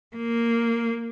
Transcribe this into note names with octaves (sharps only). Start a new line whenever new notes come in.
A#3